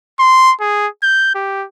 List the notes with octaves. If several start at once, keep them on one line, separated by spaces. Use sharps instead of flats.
C6
G#4
G6
G4